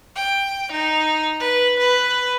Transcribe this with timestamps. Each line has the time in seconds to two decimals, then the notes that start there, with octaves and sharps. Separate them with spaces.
0.16 G5
0.71 D#4
1.40 B4
1.79 B4